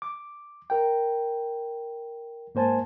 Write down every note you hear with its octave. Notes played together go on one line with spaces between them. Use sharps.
D6
A#4 G5
G#2 A#3 C5 G#5 A5